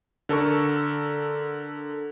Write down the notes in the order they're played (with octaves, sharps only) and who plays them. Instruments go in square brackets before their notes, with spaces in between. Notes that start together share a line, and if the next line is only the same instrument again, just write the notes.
[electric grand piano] D3 A4 A#4 C#6